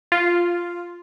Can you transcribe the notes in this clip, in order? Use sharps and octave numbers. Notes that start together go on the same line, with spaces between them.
F4